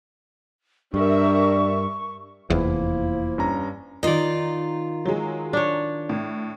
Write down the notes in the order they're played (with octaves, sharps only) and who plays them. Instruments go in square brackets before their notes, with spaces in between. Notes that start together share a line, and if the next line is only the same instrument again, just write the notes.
[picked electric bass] G2 [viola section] G3 A#4 E5 [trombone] D4 [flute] C#6
[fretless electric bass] F1 E2 [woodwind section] F3 A#3 E4
[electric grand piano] G2 C#4 A#5
[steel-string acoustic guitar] D#3 F4 [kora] D#4 D5
[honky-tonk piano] F#3 G#3
[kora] D4 C#5
[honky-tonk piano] A2